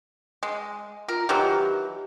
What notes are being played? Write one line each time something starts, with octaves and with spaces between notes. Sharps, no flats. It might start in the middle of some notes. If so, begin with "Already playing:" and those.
G#3
F4 A#4
D#3 E3 F#3 G4